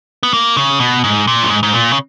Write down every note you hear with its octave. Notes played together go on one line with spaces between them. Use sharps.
B3
A#3
C#3
B2
G#2
A#2
F#2
G#2
G#2
A#2
C#3